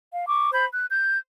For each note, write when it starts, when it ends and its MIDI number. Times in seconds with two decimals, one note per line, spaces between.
0.12 0.25 77
0.27 0.50 85
0.27 0.50 86
0.52 0.65 72
0.52 0.65 83
0.52 0.65 91
0.73 0.86 90
0.91 1.18 91